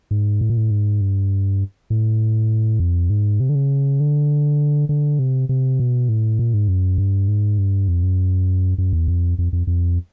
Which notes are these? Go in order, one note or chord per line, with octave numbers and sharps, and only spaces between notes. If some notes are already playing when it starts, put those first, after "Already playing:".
G#2
A2
A#2
A2
G#2
G2
A2
F2
G#2
C3
D3
C#3
D3
D3
C3
C3
B2
A2
A#2
G#2
F#2
G2
G#2
G2
F2
F#2
F#2
E2
F2
F2
F2
F2